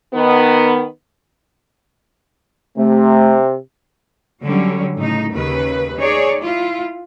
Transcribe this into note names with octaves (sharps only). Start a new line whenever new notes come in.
D#3 B3
C3 A3
D3 F#3 G3 C#4
A2 C#3 D#4
D#2 C#3 B4
D#4 G#4 C#5 D5
E4 F4